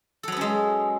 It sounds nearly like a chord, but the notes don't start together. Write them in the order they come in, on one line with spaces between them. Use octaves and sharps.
A4 F#3 B3 C#4 G#3